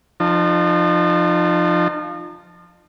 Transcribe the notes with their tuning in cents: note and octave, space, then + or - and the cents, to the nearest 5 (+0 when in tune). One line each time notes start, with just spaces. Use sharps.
F3 +0 D#4 -40 A5 +0